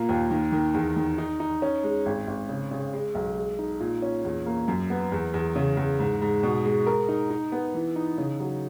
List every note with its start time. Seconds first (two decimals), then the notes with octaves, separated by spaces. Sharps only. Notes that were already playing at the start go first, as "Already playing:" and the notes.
Already playing: A#2 A#3
0.09 D#2
0.31 D#3
0.52 D#3
0.74 E2
0.96 D#3
1.18 D#4
1.40 D#4
1.62 C#4
1.83 G#3
2.06 G#1
2.28 G#1
2.49 C#3
2.71 C#3
2.93 G#3
3.15 B1
3.37 G#3
3.59 D#4
3.80 A#2
4.02 C#4
4.25 E2
4.46 A#3
4.68 F#2
4.90 B3
5.12 E2
5.34 E2
5.56 C#3
5.77 E2
5.99 G#2
6.22 G#2
6.43 B2
6.65 G#3
6.86 A#4
7.09 D#4
7.30 D#4
7.52 B3
7.74 E3
7.96 D#4
8.18 C#3
8.40 F#3